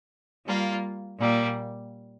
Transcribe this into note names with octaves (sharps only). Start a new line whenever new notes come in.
G3 A#3 F4
A#2 G3 A#3